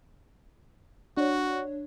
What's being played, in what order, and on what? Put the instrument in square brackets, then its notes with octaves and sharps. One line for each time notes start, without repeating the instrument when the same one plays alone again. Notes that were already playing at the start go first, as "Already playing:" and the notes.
[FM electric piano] D4 C#5 [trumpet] F#4